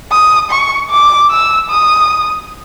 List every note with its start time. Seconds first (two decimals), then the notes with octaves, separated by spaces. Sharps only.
0.11 D#6
0.51 C#6
0.90 D6
1.30 E6
1.70 D#6